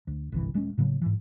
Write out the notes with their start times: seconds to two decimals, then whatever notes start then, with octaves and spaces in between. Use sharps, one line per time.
0.07 D2
0.32 G1 C2 E3
0.54 D#1 G#3 B3 C#4
0.78 A2 C#3 F#3 A#3
1.01 G#2 E3